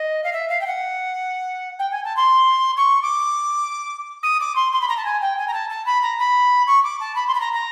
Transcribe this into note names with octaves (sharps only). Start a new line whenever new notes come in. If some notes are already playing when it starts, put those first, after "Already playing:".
Already playing: D#5
F5
E5
F5
G5
F#5
G5
G#5
A5
C6
C#6
D6
D#6
D6
C6
C6
B5
A#5
A5
G#5
G5
G#5
A#5
A5
A5
B5
A#5
B5
C#6
D6
A5
B5
C6
B5
A#5
A#5